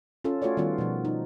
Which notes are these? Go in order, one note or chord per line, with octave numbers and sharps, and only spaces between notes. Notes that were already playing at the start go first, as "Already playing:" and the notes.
C#4 F4 A4
A3 F4 F#4 A4 C#5 D5
D#3 G3 B3 F4
B2 F3
D#4